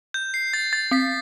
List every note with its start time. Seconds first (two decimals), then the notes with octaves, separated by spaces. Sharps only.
0.14 G6
0.34 C7
0.54 A6
0.73 A6
0.91 C4 B6